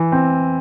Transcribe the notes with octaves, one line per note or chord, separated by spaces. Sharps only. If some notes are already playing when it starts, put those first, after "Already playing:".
Already playing: E3
C4